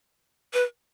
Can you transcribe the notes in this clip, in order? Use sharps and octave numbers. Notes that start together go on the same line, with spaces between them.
B4